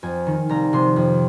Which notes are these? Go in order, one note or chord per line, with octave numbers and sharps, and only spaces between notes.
F2 G#5
D#3
C2 A#5
C3 F3 C6
F2